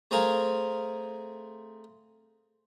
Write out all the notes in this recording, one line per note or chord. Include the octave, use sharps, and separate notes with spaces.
A3 C4 G#4 A#4 F5